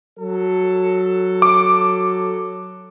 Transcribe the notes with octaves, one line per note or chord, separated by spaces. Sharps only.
F#3 A4
D6